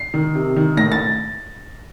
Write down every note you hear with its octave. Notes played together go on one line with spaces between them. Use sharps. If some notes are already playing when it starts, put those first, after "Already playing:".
Already playing: C7
D#3
C3
D#3
A2 A#6
A6